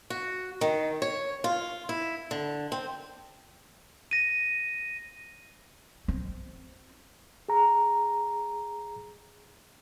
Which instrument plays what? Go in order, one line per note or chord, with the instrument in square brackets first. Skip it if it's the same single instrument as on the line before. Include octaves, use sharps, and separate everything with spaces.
[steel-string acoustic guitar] F#4
D#3
C#5
F4
E4
D3
C4
[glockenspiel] A#6 D#7
[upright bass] C4
[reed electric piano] G#4 A#5